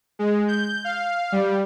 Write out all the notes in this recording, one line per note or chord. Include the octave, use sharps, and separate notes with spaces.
G#3
G6
F5
G3